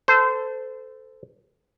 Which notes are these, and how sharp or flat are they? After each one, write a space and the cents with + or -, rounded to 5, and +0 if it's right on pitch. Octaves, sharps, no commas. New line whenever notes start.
A4 +0 C5 -25